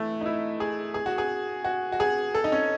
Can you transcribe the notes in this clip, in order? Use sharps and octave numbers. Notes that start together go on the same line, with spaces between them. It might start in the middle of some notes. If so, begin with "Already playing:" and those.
Already playing: E3 A3
D#4
E4
G#4
G#4
F#4
G#4
F#4
F#4
G#4
A4
D#4
C#4